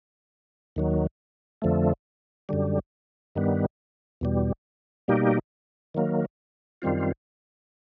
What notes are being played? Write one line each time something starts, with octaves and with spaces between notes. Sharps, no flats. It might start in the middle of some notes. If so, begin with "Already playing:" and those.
D#2 D#3 F#3
F2 D3 F3 A3
F#2 D3 G3
G2 D#3 G3 B3
E2 B2 G3
B2 G3 A#3 D#4 G4
D#3 F#3 A#3
F#2 D#3 G3 C4 F4